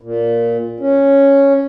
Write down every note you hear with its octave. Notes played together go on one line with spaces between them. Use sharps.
A#2
C#4